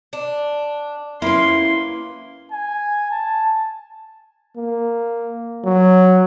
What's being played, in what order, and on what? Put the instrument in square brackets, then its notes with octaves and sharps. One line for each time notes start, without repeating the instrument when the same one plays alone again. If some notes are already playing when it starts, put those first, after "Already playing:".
[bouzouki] D4
[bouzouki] A#3 B4 [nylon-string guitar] C#4 E4 [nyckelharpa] C6
[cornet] G#5
A5
[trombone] A#3
F#3